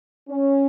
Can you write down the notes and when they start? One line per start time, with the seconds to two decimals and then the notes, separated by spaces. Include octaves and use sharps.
0.29 C#4